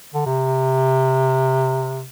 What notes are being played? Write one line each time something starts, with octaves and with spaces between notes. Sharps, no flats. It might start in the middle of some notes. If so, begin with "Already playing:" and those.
D3
C3